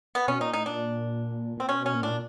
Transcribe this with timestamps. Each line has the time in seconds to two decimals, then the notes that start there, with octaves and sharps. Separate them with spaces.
0.15 B3
0.28 B2 C#4
0.41 A#2 D#4
0.53 A2 D#4
0.66 A#2 D4
1.57 A#2 C4
1.69 B2 C#4
1.86 C#4
1.94 A#2
2.02 A2 D4
2.10 A#2